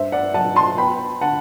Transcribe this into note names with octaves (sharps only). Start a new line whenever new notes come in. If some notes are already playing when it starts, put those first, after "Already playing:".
Already playing: G2 C5 E5
D5 F#5
F#3 F#5 A5
A5 C6
B3 G5 B5
D3 F#5 A5